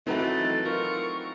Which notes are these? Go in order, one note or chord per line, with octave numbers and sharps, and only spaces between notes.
E3 F#3 A3 C4 D#4 B4 F#5
A6
F4 A#4 C#6